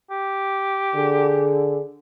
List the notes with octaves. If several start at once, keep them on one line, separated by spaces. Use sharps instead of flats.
G4
D3 G#4